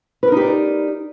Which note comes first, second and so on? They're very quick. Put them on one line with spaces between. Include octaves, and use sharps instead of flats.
B4 A#4 D#4 G4 D5